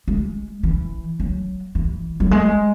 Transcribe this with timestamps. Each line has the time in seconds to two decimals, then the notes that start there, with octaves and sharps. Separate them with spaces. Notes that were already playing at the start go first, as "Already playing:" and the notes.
0.08 G#3
0.63 E3
1.20 F#3
1.75 E3
2.20 F#3
2.31 G#3